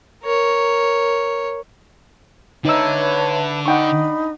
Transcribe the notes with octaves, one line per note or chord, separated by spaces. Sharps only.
A#4 C#5
D3 D#4 B4 C#5 E5 A5 E6
D4 D#4 F#5 G5 B5 C#6